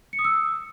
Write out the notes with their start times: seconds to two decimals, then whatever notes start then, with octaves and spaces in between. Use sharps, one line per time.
0.13 C#7
0.19 D#6
0.25 E6